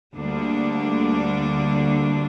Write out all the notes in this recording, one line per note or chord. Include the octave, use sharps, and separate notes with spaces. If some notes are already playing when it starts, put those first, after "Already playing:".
D2 D3 G3 A#3 D4